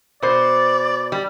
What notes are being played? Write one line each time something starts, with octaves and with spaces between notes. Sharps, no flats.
B2 C5 D5
G3